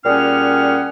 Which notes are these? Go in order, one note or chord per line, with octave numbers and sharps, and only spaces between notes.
A#2 G3 C#4 G#4 F#5 F6